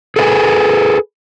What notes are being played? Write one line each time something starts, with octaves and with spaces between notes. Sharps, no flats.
G#4 A4 B4 E5 G#5